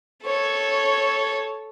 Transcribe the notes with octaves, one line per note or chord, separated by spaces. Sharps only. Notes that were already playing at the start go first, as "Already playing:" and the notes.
A4 C#5